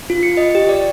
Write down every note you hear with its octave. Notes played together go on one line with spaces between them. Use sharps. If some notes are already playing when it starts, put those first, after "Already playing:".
F4
C#7
D#5
G4
D5